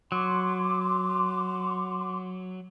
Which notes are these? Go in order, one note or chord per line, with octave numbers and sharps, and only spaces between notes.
F#3 C6 D6